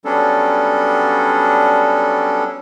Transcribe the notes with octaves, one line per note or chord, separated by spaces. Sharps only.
F#3 G3 B3 C#4 D4 A4